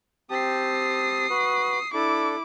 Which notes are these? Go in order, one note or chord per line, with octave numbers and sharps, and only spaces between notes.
C4 G4 A5 D#6 C7
F#4 B4
D4 E4 A4 D6